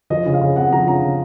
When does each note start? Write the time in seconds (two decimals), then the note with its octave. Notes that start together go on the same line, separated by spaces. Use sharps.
0.10 F3 D#5
0.26 C#3
0.34 F5
0.41 C#3
0.56 C4 F#5
0.72 F3 A#5
0.87 C#3 A#5
1.03 C#3